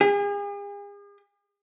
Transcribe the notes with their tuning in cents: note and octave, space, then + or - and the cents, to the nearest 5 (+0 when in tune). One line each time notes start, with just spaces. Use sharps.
G#4 -40